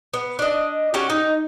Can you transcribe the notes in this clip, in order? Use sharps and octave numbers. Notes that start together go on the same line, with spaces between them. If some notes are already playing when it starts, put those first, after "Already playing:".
B3
D4 D#5
C#4 F#4 G4
D#4